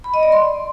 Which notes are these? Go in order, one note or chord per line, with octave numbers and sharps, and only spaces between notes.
B5
D#5
D5
C6